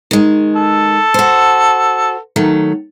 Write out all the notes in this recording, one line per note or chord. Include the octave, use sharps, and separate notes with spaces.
D#3 G#3
A4
F#4 C5
D#3 F#3 A3